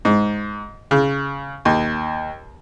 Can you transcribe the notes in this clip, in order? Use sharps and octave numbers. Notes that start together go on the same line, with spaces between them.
G#2
C#3
D#2